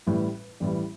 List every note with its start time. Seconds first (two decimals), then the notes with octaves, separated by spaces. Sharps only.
0.07 A1 A2 E3 G3 B4
0.60 A1 A2 E3 G3 D5